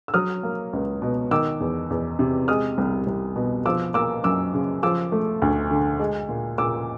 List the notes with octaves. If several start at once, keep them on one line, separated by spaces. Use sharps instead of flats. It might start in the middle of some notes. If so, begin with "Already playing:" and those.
E6
F#3 D#6 F6
A#3
C#2
B2
D#3 D6 E6
E2
E2
C3
G#3 D#6 F6
C2
C2
B2
F3 D6 E6
A#3 D6 E6
F#2 D6 E6
C#3
F3 D6 E6
A3
D2
D3
G#3
A#2
A#2 D6 E6